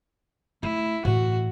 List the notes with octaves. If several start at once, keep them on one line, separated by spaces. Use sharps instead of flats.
A3 E4
A2 E3 F#4